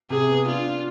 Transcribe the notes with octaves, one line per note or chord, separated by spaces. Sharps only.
C3 G#4
B3
D4 F4
D4